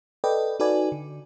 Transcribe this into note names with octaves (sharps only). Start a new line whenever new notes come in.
A4 B4 D5 D#5 G5
D#4 F#4 A4 B4 D5 G#5
D3